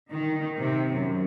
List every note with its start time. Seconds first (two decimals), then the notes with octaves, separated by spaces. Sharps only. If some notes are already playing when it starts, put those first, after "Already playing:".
0.10 D#3
0.58 C3
0.93 F#2